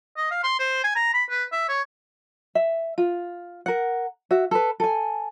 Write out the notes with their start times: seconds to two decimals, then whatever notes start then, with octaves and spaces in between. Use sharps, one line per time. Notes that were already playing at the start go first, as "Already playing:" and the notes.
0.17 D#5
0.31 F5
0.43 C6
0.59 C5
0.84 G#5
0.95 A#5
1.13 B5
1.30 B4
1.52 E5
1.69 C#5
2.55 E5
2.98 F4
3.66 A#4 F#5
4.31 F#4 E5
4.51 A4 B4
4.80 A4 G#5